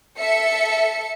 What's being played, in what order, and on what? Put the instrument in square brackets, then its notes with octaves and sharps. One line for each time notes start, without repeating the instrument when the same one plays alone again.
[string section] A4 E5 C#7